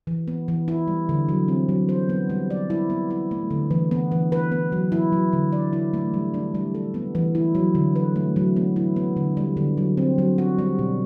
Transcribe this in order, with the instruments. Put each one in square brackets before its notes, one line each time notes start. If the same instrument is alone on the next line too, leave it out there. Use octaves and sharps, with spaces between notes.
[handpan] E3
B3
E3
E4
G3
D3
F#3
C4
F#3
C5
B3
G3
D5
E4
B3
E4
A3
D3
E3
B3
E3
B4
B3
F#3
E4
F#3
D3
D5
E4
A3
G3
D4
G3
A4
B3
E3
E4
F#3
D3
B4
A3
F#3
B3
E4
B3
D3
G3
D3
F#3
C4
F#3
F#4
G3
B2